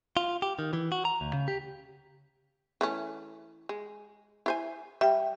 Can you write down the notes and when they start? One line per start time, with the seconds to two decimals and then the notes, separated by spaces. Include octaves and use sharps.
0.17 F4
0.42 G4
0.59 D#3
0.73 E3
0.92 F#4
1.05 A#5
1.21 D2
1.33 C#3
1.48 G4
2.81 E3 A3 C#4
3.69 G#3
4.46 E4 C5 G#5
5.01 G3 E5 G5